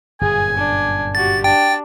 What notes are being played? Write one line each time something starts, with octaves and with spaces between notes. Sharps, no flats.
G1 F#2 A#2 G#4 G#5
D4
F#4 G4 A6
D4 G5 A5